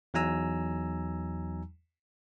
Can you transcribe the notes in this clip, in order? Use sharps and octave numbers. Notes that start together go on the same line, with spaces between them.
E2 F#3 D#4 G#5 A#5 E6